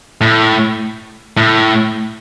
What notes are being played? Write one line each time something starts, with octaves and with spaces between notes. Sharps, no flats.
A2
A2